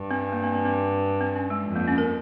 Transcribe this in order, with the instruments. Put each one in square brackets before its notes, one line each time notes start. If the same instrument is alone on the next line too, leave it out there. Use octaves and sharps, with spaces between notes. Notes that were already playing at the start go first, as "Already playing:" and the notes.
Already playing: [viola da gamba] G2
[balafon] C4
A#3
C4
C4
C4
C4
C#4
G#3
[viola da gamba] F2
[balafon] A#3
C#4
A#4